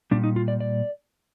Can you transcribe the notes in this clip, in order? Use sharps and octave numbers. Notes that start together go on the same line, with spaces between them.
A#2 G3 D4
D#4
F4
D5
D5